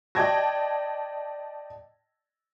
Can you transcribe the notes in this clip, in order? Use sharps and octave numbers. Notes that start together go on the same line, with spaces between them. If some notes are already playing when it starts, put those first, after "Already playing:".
D5 D#5 G5 A5 G#6 A#6